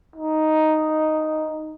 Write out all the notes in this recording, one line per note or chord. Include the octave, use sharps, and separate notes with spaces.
D#4